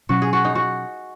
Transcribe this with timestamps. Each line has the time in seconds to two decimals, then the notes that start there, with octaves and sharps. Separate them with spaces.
0.09 B2 F#3 C#4 F#4
0.22 G#4
0.33 F#4
0.45 D#4
0.55 F#4